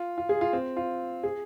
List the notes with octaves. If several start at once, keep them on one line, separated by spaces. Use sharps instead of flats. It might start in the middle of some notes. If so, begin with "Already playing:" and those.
Already playing: F4
F4
G#4
F4
C4
F4
G#4